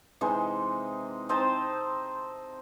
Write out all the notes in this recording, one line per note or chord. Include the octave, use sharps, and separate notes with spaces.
C3 E3 G#3 D#4
C4 D#4 C5 A5